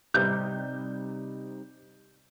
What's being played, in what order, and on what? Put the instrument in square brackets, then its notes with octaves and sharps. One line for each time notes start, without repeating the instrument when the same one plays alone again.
[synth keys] C3 G3 D#4 [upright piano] G6